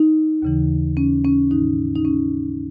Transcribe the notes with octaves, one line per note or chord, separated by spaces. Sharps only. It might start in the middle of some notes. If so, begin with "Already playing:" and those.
Already playing: D#4
D#2 C#3 E3
C#4
C#4
G#2 D#3 D#4
D#4
C#4